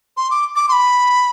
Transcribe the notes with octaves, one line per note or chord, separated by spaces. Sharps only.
C6
D6
D6
C6
B5